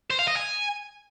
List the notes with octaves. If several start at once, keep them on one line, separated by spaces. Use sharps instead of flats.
C5
F5
D#5
G#5